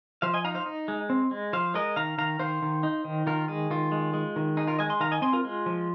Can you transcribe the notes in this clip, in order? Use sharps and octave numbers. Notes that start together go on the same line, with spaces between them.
F3 C5 F5
D#5 G#5
D#4 F5 A#5
C5 F5
D#4
G#3
C4
G#3
F3 C5 F5
G#3 A#4 D#5
D#3 F5 A#5
D#3 F5 A#5
D#3 C5 F5
D#3
D#4
D#3
D#3 F4 A#4
G#3 G#4
D#3 F4
G#3
G#3
D#3
D#4 G#4
F4 A#4
G#3 D#5 G#5
G#5 C6
D#3 F5 A#5
D#5 G#5
C4 G#5 C6
F4 A#4
G#3 F4
F3